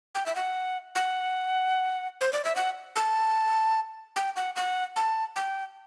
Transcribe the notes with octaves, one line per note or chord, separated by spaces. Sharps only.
G5
E5
F#5
F#5
C5
D5
E5
F#5
A5
G5
F#5
F#5
A5
G5